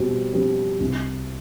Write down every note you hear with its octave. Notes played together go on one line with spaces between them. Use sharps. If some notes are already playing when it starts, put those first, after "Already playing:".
Already playing: B2 G3 C4
G3 C4
C2